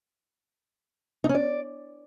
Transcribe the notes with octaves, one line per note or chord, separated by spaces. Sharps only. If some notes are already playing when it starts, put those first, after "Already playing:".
D#4
C#4
D5